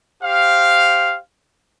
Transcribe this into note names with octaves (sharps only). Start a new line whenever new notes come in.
G4 C5 F5